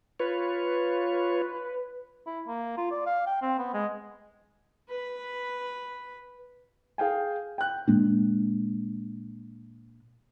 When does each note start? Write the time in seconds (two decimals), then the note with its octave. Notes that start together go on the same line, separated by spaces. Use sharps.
0.20 F4 B4 C#5
2.26 E4
2.47 A#3
2.77 F4
2.91 D5
3.06 F5
3.26 G5
3.42 C4
3.59 B3
3.74 G#3
4.89 B4 B5
6.98 G#4 F5 G5 G#5
7.58 G5 F#6
7.88 A#2 G#3 A#3 D4